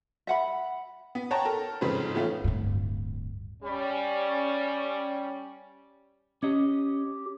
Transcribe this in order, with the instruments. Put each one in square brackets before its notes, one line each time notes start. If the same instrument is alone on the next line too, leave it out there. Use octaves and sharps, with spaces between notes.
[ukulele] E5 F#5 B5
[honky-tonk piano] B3
C#5 F#5 G5 A5 A#5
A4 A#4
F2 G#2 C#3 B4 C5
E3 A3 B3 C#4 F4
[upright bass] D1 G2
[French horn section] G3 C#4
[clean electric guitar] C#4 D#5 [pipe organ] G4